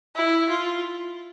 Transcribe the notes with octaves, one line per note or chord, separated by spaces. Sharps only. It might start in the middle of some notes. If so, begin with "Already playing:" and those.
E4
F4